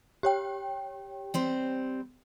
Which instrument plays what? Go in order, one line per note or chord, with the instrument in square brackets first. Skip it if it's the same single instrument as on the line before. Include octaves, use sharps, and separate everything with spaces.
[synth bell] G4 C#5 G5
[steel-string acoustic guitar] G3 C4 C5